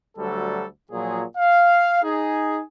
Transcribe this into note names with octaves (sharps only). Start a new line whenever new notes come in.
D2 F#3 G3 A4
A#2 F3 F#3 G#4
F5
D#4 G#4